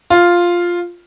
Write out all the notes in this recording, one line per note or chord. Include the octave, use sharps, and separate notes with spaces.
F4